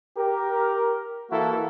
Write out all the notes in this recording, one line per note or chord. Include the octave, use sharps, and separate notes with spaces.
G4 A#4
E3 A#3 E4 F#4 A4